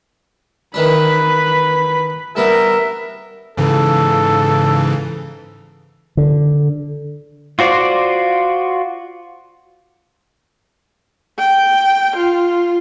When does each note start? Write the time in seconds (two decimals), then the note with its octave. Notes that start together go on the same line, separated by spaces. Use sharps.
0.74 D#3 E3 D4 B4 B5
2.36 G3 B3 D4 A#4 E5
3.57 G#2 C#3 E3 A4
6.17 D3
7.59 F4 F#4 C5 D5
11.39 G5
12.17 F4